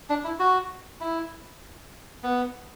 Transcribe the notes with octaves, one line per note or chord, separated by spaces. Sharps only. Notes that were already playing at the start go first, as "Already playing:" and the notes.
D4
E4
F#4
E4
B3